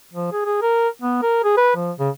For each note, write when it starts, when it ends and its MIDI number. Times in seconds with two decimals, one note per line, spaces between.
0.13 0.32 53
0.32 0.43 68
0.45 0.61 68
0.62 0.88 70
1.02 1.21 59
1.22 1.42 70
1.44 1.53 68
1.57 1.74 71
1.76 1.92 53
1.99 2.10 49